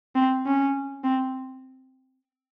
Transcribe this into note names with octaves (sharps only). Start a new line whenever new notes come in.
C4
C#4
C4